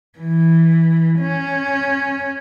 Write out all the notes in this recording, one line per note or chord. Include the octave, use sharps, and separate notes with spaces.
E3
C#4